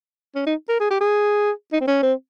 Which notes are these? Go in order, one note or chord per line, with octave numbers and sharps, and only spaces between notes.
C#4
D#4
A#4
G#4
G4
G#4
D#4
C4
C#4
C4